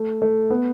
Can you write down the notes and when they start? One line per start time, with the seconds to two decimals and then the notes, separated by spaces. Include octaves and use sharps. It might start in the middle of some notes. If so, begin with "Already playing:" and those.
Already playing: A3
0.22 A3
0.50 B3